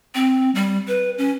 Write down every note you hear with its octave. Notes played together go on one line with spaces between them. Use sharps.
C4
G3
B4
C#4